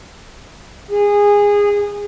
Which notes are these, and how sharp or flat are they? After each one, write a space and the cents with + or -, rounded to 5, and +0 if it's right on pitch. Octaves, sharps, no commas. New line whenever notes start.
G#4 -20